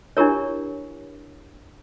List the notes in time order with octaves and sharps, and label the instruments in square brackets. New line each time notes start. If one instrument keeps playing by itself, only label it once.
[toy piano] D4 E4 G4 A#4 C#5